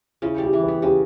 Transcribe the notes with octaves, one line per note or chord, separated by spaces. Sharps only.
C#3 E4
G3 G4
E3
B4
B3
C#3 G4